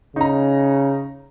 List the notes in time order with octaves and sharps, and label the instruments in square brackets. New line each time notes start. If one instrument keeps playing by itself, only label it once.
[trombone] C#3 [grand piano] D#4 A#5